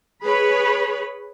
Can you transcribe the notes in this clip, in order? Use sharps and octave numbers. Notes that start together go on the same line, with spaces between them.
G#4 B4 C#5 B5